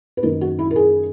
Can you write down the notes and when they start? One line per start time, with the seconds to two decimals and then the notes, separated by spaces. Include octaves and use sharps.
0.17 B4
0.23 F#2 D#3 A#3 D#4 A#4
0.41 F#4
0.59 E4
0.71 A#4
0.76 G#4